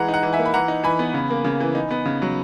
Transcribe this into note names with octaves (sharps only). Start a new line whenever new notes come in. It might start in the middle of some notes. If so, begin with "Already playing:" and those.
Already playing: E3 G#3 F#5 A#5
D#4
F#5 A#5
E3
E5 G#5
A#3
B5
E3 F#5 A#5
D#4
E3 G#5 B5
B3
C#3
A#3
C#3
E3
D#4
B3
C#3
F#3